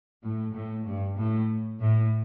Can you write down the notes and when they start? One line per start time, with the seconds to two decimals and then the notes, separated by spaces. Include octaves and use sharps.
0.22 A2
0.52 A2
0.84 G2
1.16 A2
1.79 A2